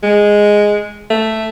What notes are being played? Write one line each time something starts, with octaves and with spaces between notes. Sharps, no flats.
G#3
A3